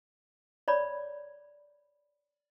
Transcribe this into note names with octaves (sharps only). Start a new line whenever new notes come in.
C#5 D5 B5